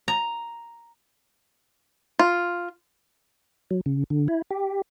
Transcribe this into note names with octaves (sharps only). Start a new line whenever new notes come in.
A#5
F4
F#3
C#3
D3
E4
G4